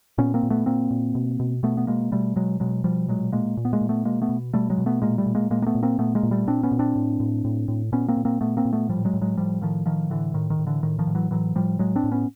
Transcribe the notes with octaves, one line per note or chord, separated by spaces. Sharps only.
A#2 B3 C#4
A#3 C4
A#2
A3 B3
A#2 A#3 C4
A#2
B2
B2
B2 A3 B3
B3
B2 G#3 A#3
B2 G3 A3
B2 F#3 G#3
B2 F#3 G#3
B2 F3 G3
A#2 F#3 G#3
A#2 G#3 A#3
A#2
B3
G#3 A#3
A#2
A3 B3
B2 G#3 A#3
A3 B3
B2
B2 G3 A3
F#3 G#3
B2
A3 B3
A#2 G#3 A#3
G3 A3
A#2
G#3 A#3
A#2 G#3 A#3
A#3
A3 B3
A#2
A#3 C4
A#2 A3 B3
G#3 A#3
A#2
G3 A3
A#2 C4 D4
B3 C#4
A#2
C4 D4
A2
A2
A2
A2
A#2 B3 C#4
A#3 C4
A#2
A#3 C4
A#2 A3 B3
A#3 C4
A#2
A3 B3
A2 F3 G3
F#3 G#3
A2
F#3 G#3
A2 F3 G3
A2 D#3 F3
A2 D#3 F3
A2 D3 E3
A2 D#3
D#3
A2
D3 E3
A2 D#3
D#3 F3
A2
E3 F#3
A2 E3 F#3
A2 F3 G3
A2 F#3 G#3
C4 D4
A2
B3 C#4